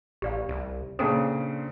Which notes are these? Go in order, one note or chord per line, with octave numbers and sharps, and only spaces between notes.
A1 G4 D5 F5
C2
A#2 C#3 C4 D4 A4